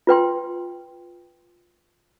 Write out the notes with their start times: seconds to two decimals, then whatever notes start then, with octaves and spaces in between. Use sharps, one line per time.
0.07 F4 B4 G5 C6